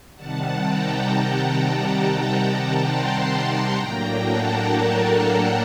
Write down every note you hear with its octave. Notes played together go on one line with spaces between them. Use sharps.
C3 D#3 G3 F#5 A5
G5 A#5
A5 C6
A5 C6
A2 F#3 A#3 D4 G5 A#5
F#5 A5
A#4
A4
A#4